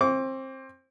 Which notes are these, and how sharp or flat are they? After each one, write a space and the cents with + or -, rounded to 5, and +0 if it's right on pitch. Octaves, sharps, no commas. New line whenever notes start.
C4 +20 D6 -30